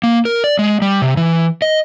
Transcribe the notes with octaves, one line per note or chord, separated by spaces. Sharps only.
A#3
A#4
D5
G#3
G3
C3
E3
D#5